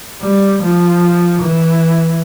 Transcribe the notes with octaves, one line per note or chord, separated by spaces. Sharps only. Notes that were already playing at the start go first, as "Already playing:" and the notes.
G3
F3
E3